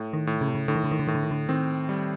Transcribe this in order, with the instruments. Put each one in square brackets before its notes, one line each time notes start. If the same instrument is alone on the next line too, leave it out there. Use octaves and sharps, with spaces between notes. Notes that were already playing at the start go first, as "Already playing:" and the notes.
Already playing: [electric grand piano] A2
[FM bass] D#3
[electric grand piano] A2
[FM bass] C#3
C3
C#3
[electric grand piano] A2 [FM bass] D3
[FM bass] D#3
D3
D#3
D3
[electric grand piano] A2 [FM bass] D#3
[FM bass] D3
D#3
D3
[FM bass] D#3 [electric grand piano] C4
[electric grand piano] G3